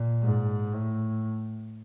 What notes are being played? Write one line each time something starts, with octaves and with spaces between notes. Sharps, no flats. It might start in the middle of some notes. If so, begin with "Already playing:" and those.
Already playing: A#2
G#2
A2